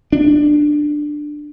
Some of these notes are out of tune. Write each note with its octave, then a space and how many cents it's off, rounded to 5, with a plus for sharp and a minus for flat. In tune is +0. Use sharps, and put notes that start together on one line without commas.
D4 +15